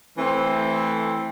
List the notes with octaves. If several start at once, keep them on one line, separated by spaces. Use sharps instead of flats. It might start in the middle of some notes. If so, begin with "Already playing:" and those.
E3 A3 C4